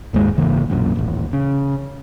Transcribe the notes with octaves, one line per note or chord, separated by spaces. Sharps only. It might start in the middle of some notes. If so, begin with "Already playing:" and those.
F#1 D#2 G#2 G#3
G#1 C#3 E3 A#3
B1 F#2 A#2
D#1 A1
C#3